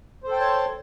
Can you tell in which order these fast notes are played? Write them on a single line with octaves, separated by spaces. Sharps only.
C5 A4 G5 A5 C#5